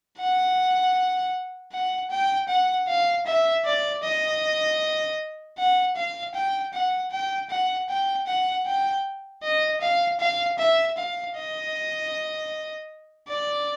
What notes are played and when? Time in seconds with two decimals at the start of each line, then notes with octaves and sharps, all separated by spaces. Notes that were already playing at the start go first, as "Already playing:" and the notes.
0.19 F#5
1.72 F#5
2.11 G5
2.49 F#5
2.88 F5
3.26 E5
3.65 D5
4.03 D#5
5.58 F#5
5.96 F5
6.35 G5
6.74 F#5
7.12 G5
7.50 F#5
7.89 G5
8.27 F#5
8.66 G5
9.43 D#5
9.81 F5
10.20 F5
10.59 E5
10.97 F5
11.36 D#5
13.28 D5